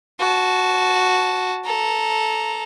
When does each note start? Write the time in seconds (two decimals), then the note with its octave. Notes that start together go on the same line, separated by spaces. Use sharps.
0.20 F#4 A5
1.65 A4 A#5